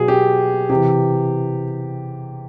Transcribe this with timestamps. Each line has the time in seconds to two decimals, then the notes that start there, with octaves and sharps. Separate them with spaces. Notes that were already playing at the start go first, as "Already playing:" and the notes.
Already playing: B2 F#3 G#4
0.08 G4
0.70 C3 E3 G4